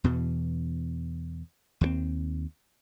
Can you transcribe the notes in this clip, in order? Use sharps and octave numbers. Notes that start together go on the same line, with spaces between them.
E2 B2 E3
D#2 G3 C4